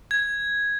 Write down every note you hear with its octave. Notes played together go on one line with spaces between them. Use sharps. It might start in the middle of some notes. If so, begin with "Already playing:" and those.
G#6